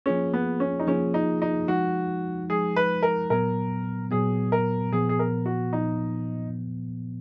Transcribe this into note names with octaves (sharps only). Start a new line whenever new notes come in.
F3 A#3 C#4 F4 G#4
B3
C#4
D#4
F3 A#3 C#4 F4 G#4
D#4
D#4
F3 G#3 D#4 F#4
F3 G#3 D#4 G#4
B4
A#4
A#2 F#3 B3 A#4
A#2 F#3 B3 G#4
A#4
A#2 F3 B3 G#4
G#4
A#4
F#4
A#2 F3 B3 D#4